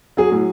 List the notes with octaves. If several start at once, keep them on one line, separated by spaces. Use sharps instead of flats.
F#3 G#4
A2